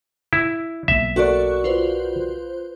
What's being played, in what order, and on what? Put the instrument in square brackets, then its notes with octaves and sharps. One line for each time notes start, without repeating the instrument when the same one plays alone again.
[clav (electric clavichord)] E4
[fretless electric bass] B1 A#3 [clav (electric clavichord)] E5
[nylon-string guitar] F#4 A#4 D5 [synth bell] A4 C#6 F#6
[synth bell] F4 B4 C5